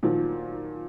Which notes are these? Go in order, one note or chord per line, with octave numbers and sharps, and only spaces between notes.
A#2 D#3 F3 F#3